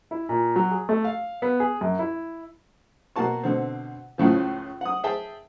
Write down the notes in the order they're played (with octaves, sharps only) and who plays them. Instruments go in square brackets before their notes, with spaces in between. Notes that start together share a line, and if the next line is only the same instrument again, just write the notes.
[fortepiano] E4
A#2
F#3
G#4
A3
F5
B3
G#4
F#2
E4
B2 A#3 F#4 A5 C#6
B2 D3 C4
C#2 A2 C#3 F3
F#5 D#6
G#4 E5 G5 A5